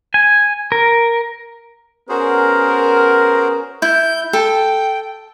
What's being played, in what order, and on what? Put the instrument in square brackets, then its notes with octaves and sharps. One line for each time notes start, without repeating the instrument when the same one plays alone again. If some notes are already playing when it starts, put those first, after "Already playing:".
[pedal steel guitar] G#5
A#4
[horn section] B3 C#4 A#4 [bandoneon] F#4 G#4 C5
[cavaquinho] E4 [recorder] G6
[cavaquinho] A4 [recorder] G5